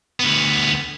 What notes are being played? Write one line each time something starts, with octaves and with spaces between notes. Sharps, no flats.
D2 B3